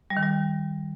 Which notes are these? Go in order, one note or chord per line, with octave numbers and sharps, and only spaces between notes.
G3
D#3
G3